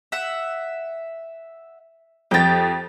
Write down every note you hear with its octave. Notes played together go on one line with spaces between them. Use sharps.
E5 F#5
F2 G4 G5 A6